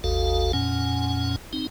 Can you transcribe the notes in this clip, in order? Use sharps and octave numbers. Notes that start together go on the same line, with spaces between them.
G#1 D#2 F#4 A4 F5
F2 A#2 C#4 F#5 G#5
C4 D#4